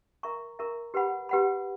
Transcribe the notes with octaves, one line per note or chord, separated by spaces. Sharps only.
A#4 E5 A#5 C#6
A#4 E5 A#5 C#6
G4 B4 F#5 B5
G4 B4 F#5 B5